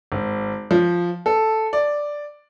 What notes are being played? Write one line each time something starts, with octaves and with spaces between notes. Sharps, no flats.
G#1
F3
A4
D5